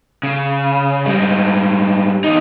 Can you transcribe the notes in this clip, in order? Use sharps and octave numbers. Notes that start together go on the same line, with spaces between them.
C#3
G#2 G3
E2 D#4